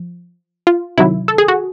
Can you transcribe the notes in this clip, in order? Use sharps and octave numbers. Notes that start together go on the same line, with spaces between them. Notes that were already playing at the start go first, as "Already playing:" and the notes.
Already playing: F3
F4
C3 D#3 F#3 E4
A4
G#4
F#4